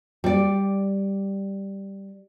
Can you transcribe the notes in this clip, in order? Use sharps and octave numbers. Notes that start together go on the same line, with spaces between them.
G3 D5